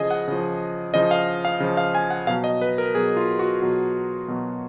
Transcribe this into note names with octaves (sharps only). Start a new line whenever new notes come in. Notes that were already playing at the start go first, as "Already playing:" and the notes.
Already playing: C#3 F3 G#4 D#5
F#5
C#3 F3
C#3 F3 D#5
F5
F5
C#3 F3
F5
G#5
F#5
B2 F#3 F5
D#5
B4
A#4
B2 F#3 G#4
F4
F#4
B2 F#3
B2 F#3